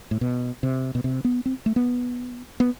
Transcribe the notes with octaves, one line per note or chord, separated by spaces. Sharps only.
A2
B2
C3
B2
C3
B3
C4
A3
B3
B3